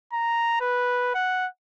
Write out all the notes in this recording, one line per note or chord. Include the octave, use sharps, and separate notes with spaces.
A#5
B4
F#5